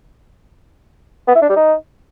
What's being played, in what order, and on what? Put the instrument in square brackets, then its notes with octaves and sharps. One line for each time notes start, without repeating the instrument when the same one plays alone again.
[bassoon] B3
E4
D4
G3
D#4